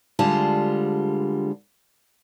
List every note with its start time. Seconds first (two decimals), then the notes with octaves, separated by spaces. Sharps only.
0.19 D2 D3 G3 G#3 F4 A5